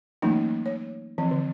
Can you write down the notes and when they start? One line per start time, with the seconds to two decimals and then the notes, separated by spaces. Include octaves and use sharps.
0.22 E3 F#3 A3 A#3 C#4 D#4
0.66 C#5
1.18 E3 F3 C4
1.31 D3